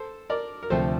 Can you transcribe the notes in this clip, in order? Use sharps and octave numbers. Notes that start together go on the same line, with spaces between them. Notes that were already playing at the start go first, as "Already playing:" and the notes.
Already playing: A4 C5
A#4 D5
A#4
D2 C3 F3 A3 C4 A4 C5